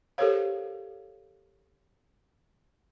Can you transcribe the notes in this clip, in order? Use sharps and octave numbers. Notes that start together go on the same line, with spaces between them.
G4 A4 A#4 C5 C#5 F5